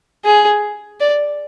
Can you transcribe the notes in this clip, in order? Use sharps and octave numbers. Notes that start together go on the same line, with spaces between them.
G#4
D5